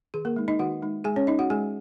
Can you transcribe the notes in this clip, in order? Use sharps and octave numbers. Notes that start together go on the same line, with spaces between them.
D#3 G#4
A#3 A#4
G#3 D#4
D#4 D#5
D#3 F#4 F#5
G#3 D#4
G#3 G#4 G#5
C#4 C#5
D#4 D#5
F#4 F#5
G#3 G#4 G#5